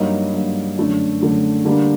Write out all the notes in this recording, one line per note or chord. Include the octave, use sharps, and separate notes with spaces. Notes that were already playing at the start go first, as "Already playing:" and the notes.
Already playing: G2 F#3 A#3 D#4
G2 F#3 A#3 D#4
F#2 D3 A3 D4
F#2 D3 A3 D4
D3 G3 A#3 D4